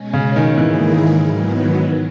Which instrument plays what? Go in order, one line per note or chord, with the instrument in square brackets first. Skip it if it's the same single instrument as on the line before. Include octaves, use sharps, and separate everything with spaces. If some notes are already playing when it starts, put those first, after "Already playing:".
Already playing: [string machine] B2 G#3 C#4
[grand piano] C#3
D#3
[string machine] G#2 D#3 A#3 E4 G#4 [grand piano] E3
[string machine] G#2 D#3 F#3 B3